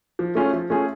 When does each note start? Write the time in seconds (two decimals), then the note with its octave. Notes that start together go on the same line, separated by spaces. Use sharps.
0.19 F3
0.35 A3 C#4 F4 G#4
0.53 F3
0.70 A3 C#4 F4 G#4